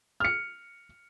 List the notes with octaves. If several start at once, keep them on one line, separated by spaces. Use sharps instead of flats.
F6 C#7